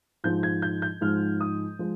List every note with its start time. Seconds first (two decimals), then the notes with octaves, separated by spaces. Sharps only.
0.24 G#2 F3 G#3 G6
0.43 G#6
0.62 G6
0.82 G6
1.01 G#2 F3 G#3 F6
1.41 D#6
1.79 F3 G#3